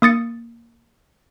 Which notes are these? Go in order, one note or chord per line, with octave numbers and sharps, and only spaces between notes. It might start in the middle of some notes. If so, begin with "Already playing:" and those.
A#3 D#6 A6 C#7